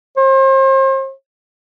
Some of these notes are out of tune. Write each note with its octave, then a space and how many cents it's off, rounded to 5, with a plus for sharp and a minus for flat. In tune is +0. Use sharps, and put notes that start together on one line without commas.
C5 +40